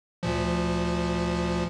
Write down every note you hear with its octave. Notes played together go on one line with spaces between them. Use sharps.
D2 A#2 F3